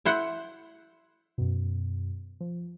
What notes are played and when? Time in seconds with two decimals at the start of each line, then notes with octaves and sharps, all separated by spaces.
0.06 E4 C5 F#5
1.38 F#2 B2
2.41 F3